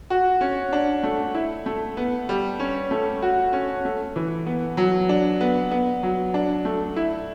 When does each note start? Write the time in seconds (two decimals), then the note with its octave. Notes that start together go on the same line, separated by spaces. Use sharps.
0.10 F#4
0.41 C#4
0.73 D4
1.03 A3
1.34 E4
1.66 A3
1.97 B3
2.29 G3
2.60 C#4
2.91 A3
3.22 F#4
3.53 C#4
3.85 A3
4.16 E3
4.46 B3
4.77 F#3
5.09 D4
5.41 B3
5.71 B3
6.03 F#3
6.34 D4
6.65 A3
6.96 E4